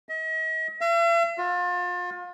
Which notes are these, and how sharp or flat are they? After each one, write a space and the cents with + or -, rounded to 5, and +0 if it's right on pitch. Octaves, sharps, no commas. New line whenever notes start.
D#5 +45
E5 +45
F4 +35